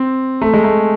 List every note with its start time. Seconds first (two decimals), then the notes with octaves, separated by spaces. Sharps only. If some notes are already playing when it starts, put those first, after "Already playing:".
Already playing: C4
0.41 A3
0.53 G#3
0.64 A3